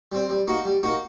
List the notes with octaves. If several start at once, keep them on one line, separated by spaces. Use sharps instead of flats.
G3 C4
G3
A#3 D#4 F#4
G3
A#3 D#4 F#4